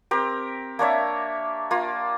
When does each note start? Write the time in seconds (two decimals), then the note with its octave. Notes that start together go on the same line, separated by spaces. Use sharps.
0.11 C4 G4 A#4
0.79 A#3 D4 C#5 E5
1.71 A#3 F4